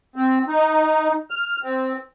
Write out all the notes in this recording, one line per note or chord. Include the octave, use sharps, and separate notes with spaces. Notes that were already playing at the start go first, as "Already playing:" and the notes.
C4
D#4
F6
C4